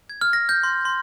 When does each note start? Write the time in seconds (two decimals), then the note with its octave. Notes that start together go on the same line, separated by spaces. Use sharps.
0.10 G#6
0.21 F6
0.33 A#6
0.49 G6
0.63 C6
0.85 C6